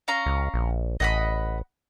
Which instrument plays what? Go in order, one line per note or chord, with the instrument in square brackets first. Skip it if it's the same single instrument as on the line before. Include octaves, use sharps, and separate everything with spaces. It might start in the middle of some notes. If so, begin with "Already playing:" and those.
[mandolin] C#4 F5 A#5
[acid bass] C#2
A#1
[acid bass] A1 [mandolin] D#5 F#5 B5